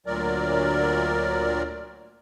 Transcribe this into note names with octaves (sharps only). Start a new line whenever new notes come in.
D2 A#2 F#3 A#4 D5